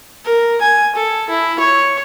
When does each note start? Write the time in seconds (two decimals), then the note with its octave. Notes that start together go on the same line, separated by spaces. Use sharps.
0.25 A#4
0.61 G#5
0.96 A4
1.29 E4
1.60 C#5